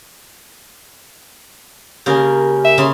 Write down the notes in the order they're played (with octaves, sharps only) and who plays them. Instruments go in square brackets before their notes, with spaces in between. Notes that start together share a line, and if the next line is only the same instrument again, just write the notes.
[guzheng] C#3 A#3 A#4 [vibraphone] G4 G#5
[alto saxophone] E5
[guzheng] C#3 C6